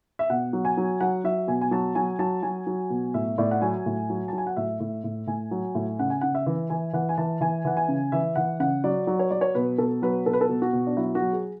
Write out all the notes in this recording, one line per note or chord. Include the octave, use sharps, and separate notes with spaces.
E5
B2 F#5
F#3
G#5
F#3
F#3 F#5
F#3 E5
B2 G#5
G#5
F#3 A5
F#3 G#5
F#3 A5
F#3 G#5
F#3
B2
A2 E5
A2 D5
F#5
F#3 G#5
A2
F#3
A5
F#3
G#5
F#5
A2 E5
A2
A2
A2 G#5
F#3
A2
C#3 F#5
G#5
C#3 F#5
E5
E3
E3 G#5
E3 F#5
G#5
E3 A5
E3 G#5
E3 F#5
G#5
C#3
E3 E5
E3 F#5
C#3 F#5
F#3 D5
F#3
C#5
F#3 D5
C#5
B2 B4
B2 A4
F#3 B4
B2 A4
B4
A4
B2
F#4
B2
D4
F#3 E4
F#4
F#3
G#4